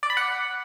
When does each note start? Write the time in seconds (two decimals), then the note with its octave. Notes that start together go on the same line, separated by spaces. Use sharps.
0.03 D5
0.10 B5
0.17 F#5